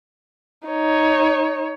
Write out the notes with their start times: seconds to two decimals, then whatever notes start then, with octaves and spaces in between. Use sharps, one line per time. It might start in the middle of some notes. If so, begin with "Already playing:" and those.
0.68 D#4 C#5